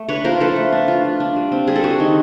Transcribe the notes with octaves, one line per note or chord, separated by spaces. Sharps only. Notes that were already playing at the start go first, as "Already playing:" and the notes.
Already playing: A3
D4 B4 C#5
F3 A#4 C5
F3 A4 B4
A3
D4
F4
F4
D4
G3
C4
G3 G#4
A4
C4 F#4 G#4
D#3